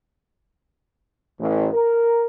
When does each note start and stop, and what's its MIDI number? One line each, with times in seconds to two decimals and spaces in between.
1.40 1.68 33
1.74 2.26 70